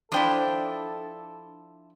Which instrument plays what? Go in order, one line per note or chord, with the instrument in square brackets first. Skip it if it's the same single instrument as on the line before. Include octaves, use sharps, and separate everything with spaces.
[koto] F3 D4 [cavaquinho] E4 G5 D#6 [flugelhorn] A4